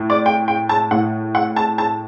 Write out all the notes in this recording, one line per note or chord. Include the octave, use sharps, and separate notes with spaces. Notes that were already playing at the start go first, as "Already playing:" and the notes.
Already playing: A2
D5
G5
G5
A5
A2 F#5
F#5
A5
A5